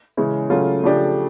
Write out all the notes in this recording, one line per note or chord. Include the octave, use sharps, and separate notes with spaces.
C#3 E3 G#3 C#4
C#3 F#3 A3 C#4 F4
C#3 F3 A3 D4 G4